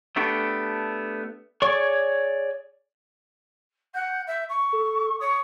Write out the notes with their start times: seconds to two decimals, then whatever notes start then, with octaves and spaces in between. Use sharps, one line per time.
0.16 A3 B3 D4 G4 C#6
1.62 G#4 C#5 D5 C#6
3.94 F#5 G6
4.27 E5
4.49 C#6
4.73 A4
5.20 C#5 D#6